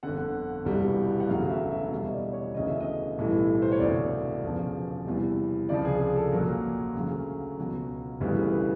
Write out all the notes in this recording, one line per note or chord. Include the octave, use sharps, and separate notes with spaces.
G1 F2 D3 F#5
E1 E2 C3 E3 G3
F#5
E1 D2 C#3 F#3 F5
E5
E5
E2 B2 G3 E5
D#5
D5
C#5
E1 D2 C#3 D#5
E5
D#5
B1 A2 E3 G3
C5
C#5
E1 D2 C3 D5
E1 E2 C#3 F3
E2 C3 E3 G3
C#2 C3 F3 D5
G#4
G#4
A4
A#1 A#2 F#3 A#4
D2 C#3 F#3
C#2 B2 F#3
E1 D2 C#3 E3 G3 B4
B4